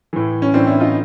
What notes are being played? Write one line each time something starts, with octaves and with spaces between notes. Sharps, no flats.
A2 E3
C#4
A2 E3 C4 D4
D4 E4
D#4 F4